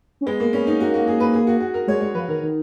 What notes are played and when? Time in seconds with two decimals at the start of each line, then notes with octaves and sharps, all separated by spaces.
0.21 C#4
0.26 G#3 B3
0.40 A#3
0.53 B3 C#4
0.67 D#4
0.80 A#3 F#4
0.94 F#4
1.07 G#4
1.20 B4
1.34 G#4
1.47 F#4
1.60 F#4
1.74 A#4
1.87 G#3 C#5
2.01 G#3 C#5
2.15 F3 B4
2.28 D#3 A#4
2.41 D#3